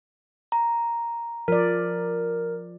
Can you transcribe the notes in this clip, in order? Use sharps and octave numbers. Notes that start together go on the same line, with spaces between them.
A#5
F3 A#4 D5